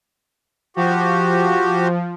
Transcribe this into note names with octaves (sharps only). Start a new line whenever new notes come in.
F3 F#4 G4